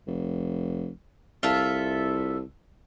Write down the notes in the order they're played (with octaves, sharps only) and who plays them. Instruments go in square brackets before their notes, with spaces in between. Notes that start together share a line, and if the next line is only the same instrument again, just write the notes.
[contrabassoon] F1
[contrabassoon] C2 [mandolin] F4 A4 E5